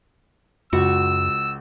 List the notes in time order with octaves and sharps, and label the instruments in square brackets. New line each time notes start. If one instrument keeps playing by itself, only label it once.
[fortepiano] C#2 [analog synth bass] F#2 [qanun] F#4 [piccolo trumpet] E6